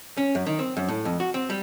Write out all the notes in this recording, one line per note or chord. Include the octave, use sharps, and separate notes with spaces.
C#4
F#2
D#3
C4
F#2
A2
F2
F#4
C4
G3